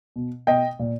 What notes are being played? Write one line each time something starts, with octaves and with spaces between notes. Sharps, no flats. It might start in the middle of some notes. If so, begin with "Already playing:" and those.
B2
B2 D#5 G5
A#2